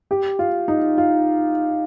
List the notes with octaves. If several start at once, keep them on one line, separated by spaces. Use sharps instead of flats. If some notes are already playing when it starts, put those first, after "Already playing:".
G4
F4
D#4
F4